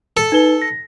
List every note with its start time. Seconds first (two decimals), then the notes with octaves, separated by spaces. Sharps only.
0.17 A4
0.32 D#4 B4 G7
0.62 A#6